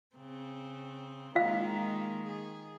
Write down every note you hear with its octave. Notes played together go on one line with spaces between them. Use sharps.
C#3 C4
D#3 G#3 A#3 F4 F5
G#4